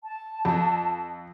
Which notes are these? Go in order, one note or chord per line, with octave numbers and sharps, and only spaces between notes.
A5
F2